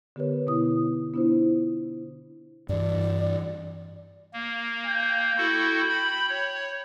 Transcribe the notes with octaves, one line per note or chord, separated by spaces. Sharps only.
D3 B3 G4 A#4 B4 C#5
B2 B3 E4 D#6
B3 D4 E4 F4 C5
G2 E3 D5
A#3
G5
E4 F#4 A4
B5
C#5